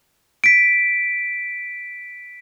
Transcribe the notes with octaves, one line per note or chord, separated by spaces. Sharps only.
B6 D7